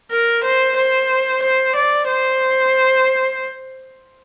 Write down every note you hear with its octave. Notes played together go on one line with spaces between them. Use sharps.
A#4
C5
C5
C5
D5
C5